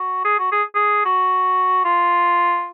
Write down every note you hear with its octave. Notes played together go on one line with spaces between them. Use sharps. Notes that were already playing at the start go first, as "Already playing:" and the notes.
Already playing: F#4
G#4
F#4
G#4
G#4
F#4
F4